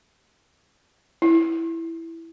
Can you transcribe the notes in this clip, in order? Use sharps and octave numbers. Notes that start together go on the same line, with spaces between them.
E4